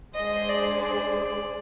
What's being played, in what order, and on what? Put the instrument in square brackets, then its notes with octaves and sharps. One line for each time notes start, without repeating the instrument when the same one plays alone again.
[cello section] G#3 D4 G#4 C5 [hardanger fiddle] D#5
[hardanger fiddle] D5
D5